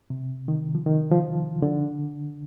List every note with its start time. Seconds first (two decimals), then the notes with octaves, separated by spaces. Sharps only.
0.10 C3
0.48 D#3
0.75 F3
0.86 D#3
1.11 F3
1.62 D3